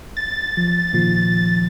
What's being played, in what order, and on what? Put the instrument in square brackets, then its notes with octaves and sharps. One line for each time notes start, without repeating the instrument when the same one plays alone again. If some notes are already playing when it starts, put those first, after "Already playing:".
[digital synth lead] A6
[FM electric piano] F3
A#2 D#3 F3